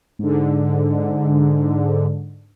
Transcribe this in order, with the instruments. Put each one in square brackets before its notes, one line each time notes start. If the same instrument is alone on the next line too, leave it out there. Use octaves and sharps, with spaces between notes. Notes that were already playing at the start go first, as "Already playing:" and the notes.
[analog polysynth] G#2 D3